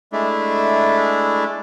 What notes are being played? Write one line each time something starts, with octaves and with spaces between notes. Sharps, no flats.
G#3 A3 D4 E4